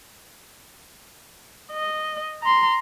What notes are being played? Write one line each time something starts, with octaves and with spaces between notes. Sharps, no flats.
D#5
A#5 C6